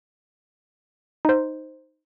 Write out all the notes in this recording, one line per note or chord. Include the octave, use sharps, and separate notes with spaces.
D#4 C5